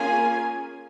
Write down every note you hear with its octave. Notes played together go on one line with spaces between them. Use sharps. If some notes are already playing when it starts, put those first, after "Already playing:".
Already playing: A#3 C#4 F4 G#4 G#5